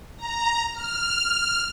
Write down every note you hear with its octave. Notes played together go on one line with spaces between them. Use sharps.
A#5
F6